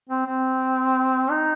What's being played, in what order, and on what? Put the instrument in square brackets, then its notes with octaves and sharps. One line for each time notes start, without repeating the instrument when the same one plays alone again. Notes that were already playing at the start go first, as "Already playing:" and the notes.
[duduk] C4
C4
D#4